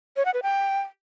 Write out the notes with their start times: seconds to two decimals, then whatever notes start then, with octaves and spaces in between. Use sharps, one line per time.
0.17 C#5
0.25 F#5
0.34 B4
0.43 G5